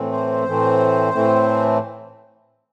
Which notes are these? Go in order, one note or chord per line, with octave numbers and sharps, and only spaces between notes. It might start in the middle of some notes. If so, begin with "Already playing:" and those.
Already playing: A2 E3 A3 C4
C5
A2 E3 A3 C4
A2 E3 A3 C4